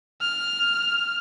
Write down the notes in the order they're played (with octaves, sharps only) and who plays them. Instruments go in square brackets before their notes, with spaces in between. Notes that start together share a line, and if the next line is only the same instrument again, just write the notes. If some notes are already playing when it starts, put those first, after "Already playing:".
[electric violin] F6